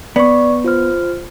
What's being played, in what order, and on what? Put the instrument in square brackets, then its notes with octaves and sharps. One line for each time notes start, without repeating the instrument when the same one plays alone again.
[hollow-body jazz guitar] B3 [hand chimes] D5 C#6
[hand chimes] F4 C5 F6